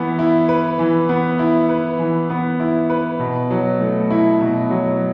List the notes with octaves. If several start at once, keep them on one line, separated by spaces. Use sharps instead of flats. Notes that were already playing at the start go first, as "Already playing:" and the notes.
Already playing: E3 B3
E4
B4
E3
B3
E4
B4
E3
B3
E4
B4
B2
F#3
A3
E4
B2
F#3